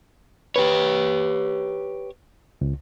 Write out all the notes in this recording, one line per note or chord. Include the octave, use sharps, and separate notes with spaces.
G4 B4 C#5
C#2